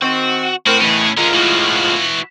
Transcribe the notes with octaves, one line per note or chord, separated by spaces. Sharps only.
D#3 C4 F#4
A2 C4 F#4 A#4
E2 D#3 E3 C#4 G#4
D3 G#3 C#4 F4 A#4
A2 E3 F3 F#4